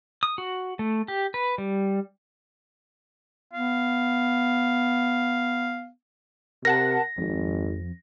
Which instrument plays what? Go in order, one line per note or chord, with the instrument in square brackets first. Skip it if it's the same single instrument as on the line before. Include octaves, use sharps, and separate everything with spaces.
[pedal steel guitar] D#6
F#4
A3
G4
B4
G3
[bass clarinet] B3 [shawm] F5
[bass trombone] C3 [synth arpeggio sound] A#4 F#5 A5 [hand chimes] A#6
[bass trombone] G#1 [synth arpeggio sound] F2